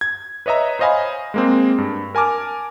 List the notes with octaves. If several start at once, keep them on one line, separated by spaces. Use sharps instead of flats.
G#6
B4 C#5 D#5 E5 A#5
C5 C#5 D#5 F5 G#5 B5
G#3 A#3 C4
G2
A#4 G#5 A5 D6 F6